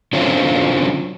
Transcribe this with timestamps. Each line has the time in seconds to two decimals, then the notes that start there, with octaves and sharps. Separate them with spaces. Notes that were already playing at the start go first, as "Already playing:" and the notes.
0.13 D3 F#3 C4 C#4 F4